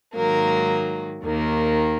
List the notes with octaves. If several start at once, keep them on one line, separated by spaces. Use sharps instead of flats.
G#2 D#3 F#3 A#3 A#4
D#2 D#3 A#3